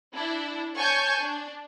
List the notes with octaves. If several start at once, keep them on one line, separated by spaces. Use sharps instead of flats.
D4 E4
C#5 G#5 A5 C#6 G6
D4